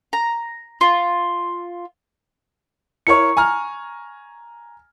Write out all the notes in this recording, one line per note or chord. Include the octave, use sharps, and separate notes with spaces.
A#5
F4
E4 A#4 C#5 C#6 C#7
G#5 A#5 F6